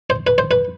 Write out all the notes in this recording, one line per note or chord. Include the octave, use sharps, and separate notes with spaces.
C5
B4
C5
B4